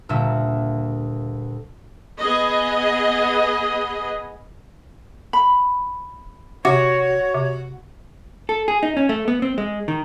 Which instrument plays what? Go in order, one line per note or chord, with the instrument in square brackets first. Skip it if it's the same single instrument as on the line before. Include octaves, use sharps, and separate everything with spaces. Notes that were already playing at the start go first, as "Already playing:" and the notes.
[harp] D2 A#2 G3 E5
[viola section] B3 G#4 D#5
[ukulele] B5
[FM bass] C3 [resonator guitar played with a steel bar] F#4 [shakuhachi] C#5
[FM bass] C3
[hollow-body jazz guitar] A4
G#4
D#4
C#4
A3
B3
C4
G#3
D#3